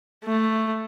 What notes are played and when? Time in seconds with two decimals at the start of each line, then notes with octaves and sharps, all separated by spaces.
0.24 A3